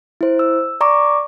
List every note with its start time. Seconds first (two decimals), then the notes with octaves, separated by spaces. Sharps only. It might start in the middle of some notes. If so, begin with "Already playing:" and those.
0.21 E4 C5
0.39 E6
0.81 D5 A#5 C#6 D6